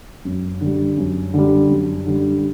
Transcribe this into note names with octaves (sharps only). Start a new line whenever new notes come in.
F#2
D3 G3
F#2
D3 G3
F#2
D3 G3